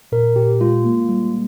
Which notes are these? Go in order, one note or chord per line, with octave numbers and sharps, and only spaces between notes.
A#2 A#4
A#2 G4
G#3 F4
A#3
G3